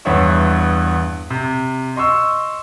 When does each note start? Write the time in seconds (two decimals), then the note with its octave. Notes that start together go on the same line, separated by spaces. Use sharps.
0.05 E2 G2 B3 C#5 E5 C#6
1.30 C3
1.96 D#5 C6 C#6 E6